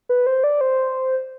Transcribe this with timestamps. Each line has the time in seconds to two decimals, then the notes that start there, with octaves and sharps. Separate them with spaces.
0.09 B4
0.27 C5
0.44 D5
0.61 C5